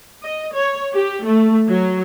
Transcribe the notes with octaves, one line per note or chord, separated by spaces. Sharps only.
D#5
C#5
G4
A3
F#3